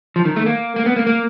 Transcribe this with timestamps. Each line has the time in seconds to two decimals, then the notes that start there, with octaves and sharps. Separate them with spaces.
0.16 F3
0.25 D#3
0.36 A3
0.46 A#3
0.76 A#3
0.86 B3
0.96 A#3
1.07 A#3